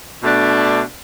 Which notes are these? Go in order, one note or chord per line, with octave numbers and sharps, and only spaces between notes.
B2 A3 D4